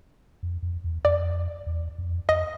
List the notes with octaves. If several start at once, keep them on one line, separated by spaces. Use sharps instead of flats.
F2
F2
E2
F2 D5
E2
F2
F2 D#5